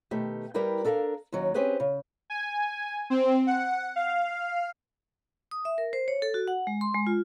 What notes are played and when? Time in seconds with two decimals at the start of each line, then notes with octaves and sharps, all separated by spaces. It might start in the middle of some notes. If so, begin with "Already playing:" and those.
0.11 B2 D#3 A3 G4
0.54 G3 E4 G4 A#4 B4 G5
0.84 D4 A4 A#4 E5 F5
1.32 D#2 D#3 F#3 C#4
1.54 C4 C#4 G4 G#4 B4 C5
1.80 C#3
2.30 G#5
3.10 C4
3.47 F#5
3.96 F5
5.51 D#6
5.65 E5
5.78 A#4
5.93 C5
6.08 C#5
6.22 A4
6.34 F#4
6.48 F#5
6.67 G#3
6.81 C6
6.95 G#3
7.07 F4